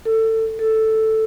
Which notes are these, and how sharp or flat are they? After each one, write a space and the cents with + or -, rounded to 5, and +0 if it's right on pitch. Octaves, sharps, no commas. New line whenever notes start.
A4 +25
A4 +0